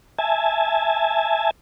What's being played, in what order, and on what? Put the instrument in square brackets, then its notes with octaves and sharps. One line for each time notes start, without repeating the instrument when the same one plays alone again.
[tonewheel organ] E5 G#5 A5